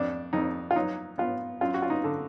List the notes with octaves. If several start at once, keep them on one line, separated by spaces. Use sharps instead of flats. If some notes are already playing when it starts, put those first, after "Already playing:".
Already playing: F2 D4
F2 D#4
F4
F#3 D#4
B3 F4
F#2 F4
F#4
F4
D#4
D3